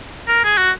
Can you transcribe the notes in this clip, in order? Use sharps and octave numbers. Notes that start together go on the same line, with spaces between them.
A#4
G#4
F#4